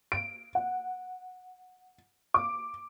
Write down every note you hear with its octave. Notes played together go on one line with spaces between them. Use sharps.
D7
F#5
D6